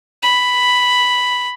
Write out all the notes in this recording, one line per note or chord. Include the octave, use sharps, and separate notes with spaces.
B5